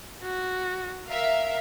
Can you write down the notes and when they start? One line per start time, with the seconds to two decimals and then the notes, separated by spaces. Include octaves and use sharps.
0.22 F#4
1.09 A#4 E5 F5